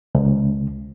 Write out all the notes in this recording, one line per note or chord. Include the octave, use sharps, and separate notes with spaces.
C#2